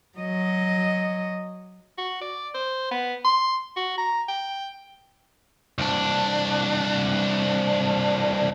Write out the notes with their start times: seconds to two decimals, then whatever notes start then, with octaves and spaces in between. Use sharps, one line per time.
0.18 F#3 D#5
1.98 F#4
2.21 D5
2.54 C5
2.91 B3
3.24 C6
3.77 F#4
3.98 A#5
4.28 G5
5.78 C2 D4